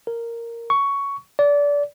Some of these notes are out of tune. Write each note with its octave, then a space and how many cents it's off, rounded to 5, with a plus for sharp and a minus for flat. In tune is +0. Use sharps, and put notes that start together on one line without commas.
A#4 -5
C#6 +10
D5 -25